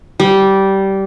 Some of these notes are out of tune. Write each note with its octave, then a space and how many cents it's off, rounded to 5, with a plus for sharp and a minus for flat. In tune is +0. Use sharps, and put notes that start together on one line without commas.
G3 -15